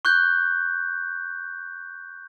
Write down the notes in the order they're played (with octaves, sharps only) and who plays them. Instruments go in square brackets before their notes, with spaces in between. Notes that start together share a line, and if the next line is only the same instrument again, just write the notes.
[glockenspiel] C#6 F#6 G6